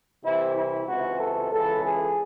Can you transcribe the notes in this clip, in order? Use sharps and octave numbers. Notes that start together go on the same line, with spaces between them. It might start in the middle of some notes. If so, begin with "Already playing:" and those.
C2 C3 E3 E4
E4
C#2 C3 E3 F#4
A4
C#2 C#3 E3 A4
G#4